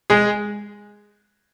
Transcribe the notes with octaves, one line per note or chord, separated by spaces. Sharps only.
G#3 G#4